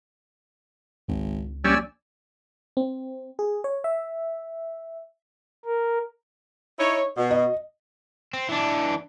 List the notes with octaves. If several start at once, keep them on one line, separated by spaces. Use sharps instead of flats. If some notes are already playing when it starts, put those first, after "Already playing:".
G#1 C#2
A#1 G3 C#4 D5 G#5 E6
C4
G#4
C#5
E5
A#4
D#4 E4 C#5
B2
D#5
C4
E3 D4